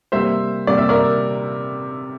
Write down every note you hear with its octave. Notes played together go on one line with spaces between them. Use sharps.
C3 G3 A#3 C5 E5
C3 G3 A#3 D5
E5
A#4 D5